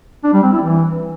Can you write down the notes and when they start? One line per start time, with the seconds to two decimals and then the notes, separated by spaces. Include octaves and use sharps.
0.24 D4
0.33 G3
0.43 C4
0.52 E4
0.62 E3